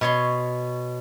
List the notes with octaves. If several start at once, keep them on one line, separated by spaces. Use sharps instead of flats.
B2 C#5 C6